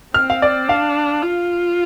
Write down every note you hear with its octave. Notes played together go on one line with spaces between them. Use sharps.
C4 F6
F5
D5
D4 F5
F4